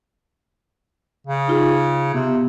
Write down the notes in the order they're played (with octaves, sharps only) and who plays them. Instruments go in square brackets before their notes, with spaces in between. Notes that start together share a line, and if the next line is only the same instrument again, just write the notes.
[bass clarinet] C#3
[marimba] D#4 F4 G#4
[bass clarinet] C3 [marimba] B3